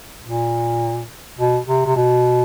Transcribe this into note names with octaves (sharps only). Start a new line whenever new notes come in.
A#2
B2
C3
C3
B2